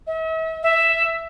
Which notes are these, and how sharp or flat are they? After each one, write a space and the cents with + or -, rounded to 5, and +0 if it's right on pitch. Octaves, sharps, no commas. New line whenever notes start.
E5 -40
E5 +5